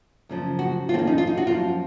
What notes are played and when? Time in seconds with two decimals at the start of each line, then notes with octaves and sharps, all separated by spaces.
0.29 F#2 C#3 F3
0.59 F#4
0.89 F2 F4
0.92 D#3 C4
0.99 C#4
1.07 D#4
1.18 F4
1.27 D#4
1.37 F#4
1.47 F#2 F3 F4